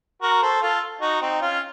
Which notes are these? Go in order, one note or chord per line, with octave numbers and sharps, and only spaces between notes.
F#4 A#4
A4 C5
F4 A4
D#4 F#4
C4 D#4
C#4 F4